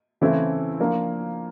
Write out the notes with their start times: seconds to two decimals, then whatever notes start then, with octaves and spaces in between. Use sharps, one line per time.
0.21 C#3 E3 A3 C4 E4
0.80 F3 A#3 D4